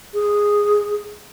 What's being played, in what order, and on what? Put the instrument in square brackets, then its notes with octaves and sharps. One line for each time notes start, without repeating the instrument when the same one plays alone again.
[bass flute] G#4